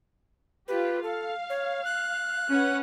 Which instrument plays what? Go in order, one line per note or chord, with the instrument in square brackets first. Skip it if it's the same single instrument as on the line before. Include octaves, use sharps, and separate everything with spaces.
[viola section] F4 G4 [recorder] B4
[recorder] A4 [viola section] F5
[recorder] C#5
F#6
[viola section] C#4 B4 F#5